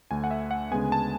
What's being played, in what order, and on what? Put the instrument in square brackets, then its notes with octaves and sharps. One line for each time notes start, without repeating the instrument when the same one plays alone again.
[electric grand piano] D2 D3 A3 G#5
F#5
E5
F#5
D2 C#3 G#3 B3 G#5
A5